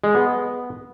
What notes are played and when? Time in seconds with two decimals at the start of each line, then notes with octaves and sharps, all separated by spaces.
0.04 G#3
0.15 B3